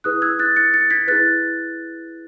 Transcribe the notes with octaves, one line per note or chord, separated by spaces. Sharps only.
E4 G#4 B4 D#6 F#6
E6 G#6
F#6 A6
A6 C#7
A6 C#7
G#6 B6
E4 G#4 B4 F#6 A6